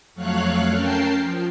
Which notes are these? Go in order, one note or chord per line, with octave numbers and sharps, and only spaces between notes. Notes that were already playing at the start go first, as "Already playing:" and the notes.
F2 F#3 A3 C#5 F5 F#6
C#4 A#4 G5 A5 C7
F3